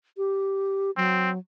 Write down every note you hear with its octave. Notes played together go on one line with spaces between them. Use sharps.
G4
F#3 C4